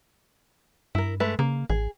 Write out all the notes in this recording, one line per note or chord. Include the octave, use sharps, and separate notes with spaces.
G2 E4 A#4
G#3 A3 B4
C#3 A#3
A1 G#4